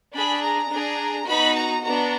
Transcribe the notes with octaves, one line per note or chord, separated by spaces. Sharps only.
D4 G#4 B5
A#5
D4 G#4
B3 D#4 F#4 B5
A#5
B3 D4 F#4 A#5